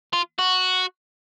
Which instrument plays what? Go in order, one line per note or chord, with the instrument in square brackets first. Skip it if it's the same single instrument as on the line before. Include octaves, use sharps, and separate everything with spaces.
[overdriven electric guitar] F4
F#4